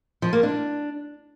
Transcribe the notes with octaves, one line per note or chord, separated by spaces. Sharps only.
F3
A#3
D4